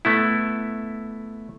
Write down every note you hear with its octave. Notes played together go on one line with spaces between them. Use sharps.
A3 B3 E4